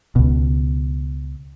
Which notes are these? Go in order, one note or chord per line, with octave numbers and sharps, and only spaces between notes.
C#2 B2